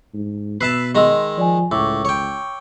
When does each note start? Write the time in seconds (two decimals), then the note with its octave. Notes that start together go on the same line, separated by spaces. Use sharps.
0.14 G#2
0.61 B2 B4 E5 A5 B5 E6 C7
0.95 D#3 G#3 D#5 A#5 C6 E6
1.38 F3 D5 G#5
1.71 C#2 A2 C#6 D6 E6
2.05 C#5 G5